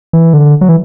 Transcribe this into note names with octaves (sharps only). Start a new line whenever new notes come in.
E3
D3
F#3
E3